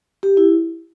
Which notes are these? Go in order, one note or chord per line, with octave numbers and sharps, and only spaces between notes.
G4
E4